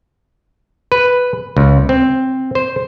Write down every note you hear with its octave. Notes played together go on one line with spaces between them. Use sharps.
B4
C#2
C4
C5